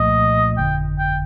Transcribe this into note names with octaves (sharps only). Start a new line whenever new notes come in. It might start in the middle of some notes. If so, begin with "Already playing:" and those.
Already playing: C2 A#2 F3 A3 D#5
G1 F2 D3 G5
G5